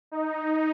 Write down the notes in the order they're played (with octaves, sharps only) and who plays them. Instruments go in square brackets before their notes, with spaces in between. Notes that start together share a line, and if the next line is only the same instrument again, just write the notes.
[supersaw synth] D#4